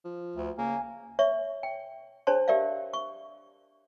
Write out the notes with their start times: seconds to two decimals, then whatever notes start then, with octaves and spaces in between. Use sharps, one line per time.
0.05 F3
0.36 D2
0.58 C#3 A#3 G#5
1.19 C#5 E5 C#6
1.63 G5
2.27 D4 G#4 C5 C#5 A5 C6
2.48 G4 A#4 D5 E5 F5
2.93 C#6